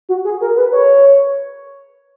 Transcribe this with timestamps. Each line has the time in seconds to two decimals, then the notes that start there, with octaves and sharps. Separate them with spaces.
0.09 F#4
0.25 G#4
0.41 A#4
0.56 B4
0.72 C#5